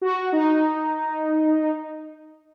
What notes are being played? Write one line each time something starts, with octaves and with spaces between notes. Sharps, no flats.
F#4
D#4